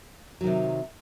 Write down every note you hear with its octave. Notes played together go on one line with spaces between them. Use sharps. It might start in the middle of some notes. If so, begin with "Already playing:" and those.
C3 D#3 F#3